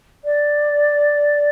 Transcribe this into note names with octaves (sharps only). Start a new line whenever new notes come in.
D5